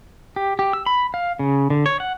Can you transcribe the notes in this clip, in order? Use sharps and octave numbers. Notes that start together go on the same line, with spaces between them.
G4
G4
E6
B5
F5
C#3
D3
C#5
F#5